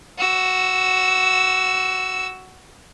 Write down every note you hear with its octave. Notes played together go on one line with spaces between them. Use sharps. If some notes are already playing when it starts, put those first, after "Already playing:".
F#4 E6